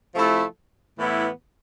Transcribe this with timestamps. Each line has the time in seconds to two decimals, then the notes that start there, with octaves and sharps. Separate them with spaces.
0.13 C3 F3 A3 E4 A4
0.97 A2 E3 B3 E4